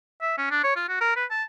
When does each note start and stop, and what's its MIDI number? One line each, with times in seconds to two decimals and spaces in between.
0.21 0.33 76
0.38 0.47 61
0.51 0.62 62
0.64 0.76 73
0.76 0.86 65
0.88 1.00 66
1.01 1.14 70
1.16 1.25 71
1.30 1.43 81